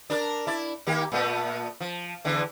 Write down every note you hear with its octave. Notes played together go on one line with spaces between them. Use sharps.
D4 A#4 D5
E4 D5
D#3 A#3 G4
A#2 A3 B3
F3
E2 D3 E3